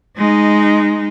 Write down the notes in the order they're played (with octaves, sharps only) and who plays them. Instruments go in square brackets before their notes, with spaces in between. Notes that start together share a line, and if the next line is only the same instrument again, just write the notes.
[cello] G#3 D#4